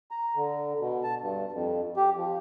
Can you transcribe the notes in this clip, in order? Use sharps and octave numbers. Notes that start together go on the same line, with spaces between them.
A#5
D3
B2
A5
G2
F2
G4
F3